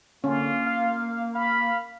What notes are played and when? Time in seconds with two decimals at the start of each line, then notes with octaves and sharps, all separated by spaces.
0.24 D3 A#3 C#4 F4
0.66 F5
1.35 F5 B5